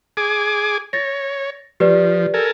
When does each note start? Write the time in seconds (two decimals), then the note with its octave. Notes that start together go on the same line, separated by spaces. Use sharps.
0.17 G#4 G#5 D6
0.93 C#5 A6 A#6
1.80 F3 G4 B4 D5
2.34 A4 A#4 G#5